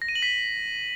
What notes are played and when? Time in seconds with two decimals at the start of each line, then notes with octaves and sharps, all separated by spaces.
0.02 A#6
0.09 D#7
0.15 F#7
0.22 B6